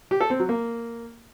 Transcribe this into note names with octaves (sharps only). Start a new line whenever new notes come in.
G4
A4
C4
F#3
A#3